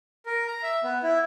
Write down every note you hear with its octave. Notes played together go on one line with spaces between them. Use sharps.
A#4
A#5
E5
B3
E4